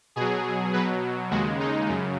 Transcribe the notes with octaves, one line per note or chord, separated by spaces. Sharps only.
B2 F#3 G#4
B2 F#3 B4
D#2 C#3 G#3 F#4
D#4
F#2 C#3